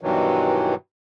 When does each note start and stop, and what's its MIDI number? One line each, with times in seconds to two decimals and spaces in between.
0.01 0.75 43
0.01 0.75 47
0.01 0.75 51
0.01 0.75 52
0.01 0.75 54